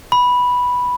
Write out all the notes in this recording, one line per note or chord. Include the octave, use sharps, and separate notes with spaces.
B5